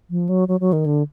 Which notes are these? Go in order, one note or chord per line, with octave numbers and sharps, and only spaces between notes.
F3
F#3
F#3
F#3
D#3
D3